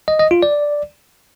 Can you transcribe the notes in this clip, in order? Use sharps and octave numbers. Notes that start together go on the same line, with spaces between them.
D#5
D#5
F4
D5